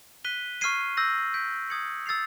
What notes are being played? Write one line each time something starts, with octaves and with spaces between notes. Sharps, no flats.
F#6 B6 D#7 G7
C#6 F6 G#6 C7 D#7
E6 G6 A#6 D#7 F#7
G6 B6 D7
D#6 G#6 C#7 F#7
E6 A6 C7 F7